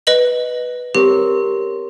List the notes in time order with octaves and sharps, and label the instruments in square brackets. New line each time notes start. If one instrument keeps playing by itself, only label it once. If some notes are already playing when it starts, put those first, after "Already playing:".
[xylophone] B4 D#5 F#7
[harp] C4 A#4 C#5 [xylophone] G4